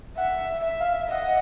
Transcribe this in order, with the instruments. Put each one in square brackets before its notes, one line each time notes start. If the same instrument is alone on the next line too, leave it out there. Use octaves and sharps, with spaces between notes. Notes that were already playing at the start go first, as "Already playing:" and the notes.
[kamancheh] E5 [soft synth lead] F#5
[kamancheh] E5
[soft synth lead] F5
[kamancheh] D#5 [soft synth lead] F#5